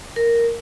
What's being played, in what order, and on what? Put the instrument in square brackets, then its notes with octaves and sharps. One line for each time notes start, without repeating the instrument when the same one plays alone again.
[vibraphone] A#4